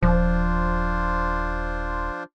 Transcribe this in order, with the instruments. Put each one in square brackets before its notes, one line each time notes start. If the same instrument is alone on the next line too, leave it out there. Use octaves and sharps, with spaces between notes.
[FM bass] D#1 [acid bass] F3 [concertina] D4 F4 C5